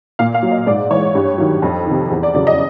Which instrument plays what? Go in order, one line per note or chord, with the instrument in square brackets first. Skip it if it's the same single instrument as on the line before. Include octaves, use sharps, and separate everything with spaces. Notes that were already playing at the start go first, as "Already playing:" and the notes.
[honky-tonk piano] A#2 F5
F5
F#3
D#5
G#2 D5
E3 C#5
G2
D#3 F#3
F2
D#3
C3
E2
D5
C#3 F#3 D5
D#5